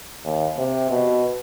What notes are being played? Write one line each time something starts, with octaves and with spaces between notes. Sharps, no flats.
D#2
C3
B2